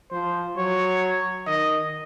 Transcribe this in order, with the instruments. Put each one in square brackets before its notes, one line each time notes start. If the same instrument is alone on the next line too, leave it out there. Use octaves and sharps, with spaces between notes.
[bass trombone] F3 [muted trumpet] C5
[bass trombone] F#3 [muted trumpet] C#5
[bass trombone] D#3 [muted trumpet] D#5